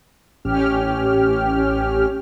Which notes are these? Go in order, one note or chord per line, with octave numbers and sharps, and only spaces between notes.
A1 C#4 G4 F6